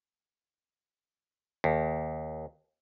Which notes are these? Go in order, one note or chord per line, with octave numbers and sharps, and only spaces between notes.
D#2